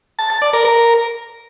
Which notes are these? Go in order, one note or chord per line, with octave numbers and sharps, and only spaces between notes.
A5
A5
D5
A#4
A#4